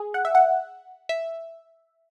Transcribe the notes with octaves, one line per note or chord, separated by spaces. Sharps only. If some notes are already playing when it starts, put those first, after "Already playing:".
Already playing: G#4
F#5
E5
F#5
E5